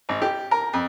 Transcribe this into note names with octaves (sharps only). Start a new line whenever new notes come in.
G#1
G4
A#4
F2